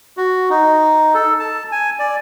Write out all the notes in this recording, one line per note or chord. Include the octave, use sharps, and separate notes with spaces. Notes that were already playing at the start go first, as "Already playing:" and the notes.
F#4
D#4
A4
A5
G#5
D5